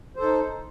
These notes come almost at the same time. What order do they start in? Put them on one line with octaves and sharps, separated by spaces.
C5 A4 D#4